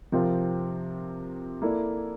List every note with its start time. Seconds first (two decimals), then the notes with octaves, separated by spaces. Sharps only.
0.12 C3 F3 C4 F4 A#4
1.62 A#3 E4 A4 D5